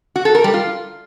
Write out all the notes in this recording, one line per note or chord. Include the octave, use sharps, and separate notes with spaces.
F#4
A4
A#4
G3
F4